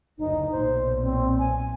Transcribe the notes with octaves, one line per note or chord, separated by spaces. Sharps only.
F#1 D2 D#4
B1 A#2 C5
C4
G#5